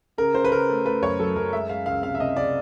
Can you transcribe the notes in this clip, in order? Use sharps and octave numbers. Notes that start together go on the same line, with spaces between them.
C#3 A#4
C#3 C5
B4
C#3 A#4
A3
A3 B4
F#2 C#5
F#3 A4
F#2 A#4
G#3 E5
G#3 F5
C#2 F5
C3 F5
E5
C3 D#5
C#2 D5